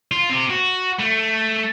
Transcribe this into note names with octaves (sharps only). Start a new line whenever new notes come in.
F4
C4 G4
F#4
A3